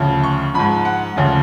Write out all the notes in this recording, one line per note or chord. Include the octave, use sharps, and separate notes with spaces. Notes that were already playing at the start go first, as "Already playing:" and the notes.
Already playing: D2 C#3 F3
C#6
G#2 F3 B5
F#5
D2 C#3 F3